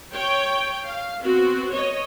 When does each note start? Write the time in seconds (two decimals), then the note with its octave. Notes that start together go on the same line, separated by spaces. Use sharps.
0.13 C#5 G5
0.87 F5
1.23 B3 C4 F#4
1.73 C#5 D#5